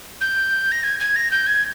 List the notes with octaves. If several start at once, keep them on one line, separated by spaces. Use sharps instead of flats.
G6
A#6
G#6
G#6
A#6
G6
G#6